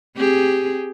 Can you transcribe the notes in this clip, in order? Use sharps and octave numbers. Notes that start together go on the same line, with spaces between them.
C4 G4 G#4